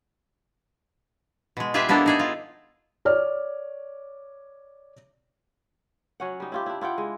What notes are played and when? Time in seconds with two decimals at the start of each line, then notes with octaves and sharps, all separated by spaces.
1.57 B2 G#3
1.74 F4 G4 G#4 B4 E5
1.89 A#3 B3 D4 E4 A4 A#4
2.06 D#4 G#4 A4
2.19 F4
3.05 C#5 D5 F6
6.20 F#3 C#4 F#5
6.40 G3 D#4
6.52 E4 F4 G4
6.66 D4 E4
6.81 E4 F4 F#5 G5
6.98 G#3